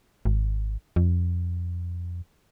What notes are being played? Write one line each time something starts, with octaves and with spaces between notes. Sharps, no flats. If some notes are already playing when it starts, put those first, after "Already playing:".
G#1
F2